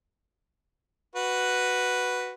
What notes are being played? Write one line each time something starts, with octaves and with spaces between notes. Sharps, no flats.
F#4 B4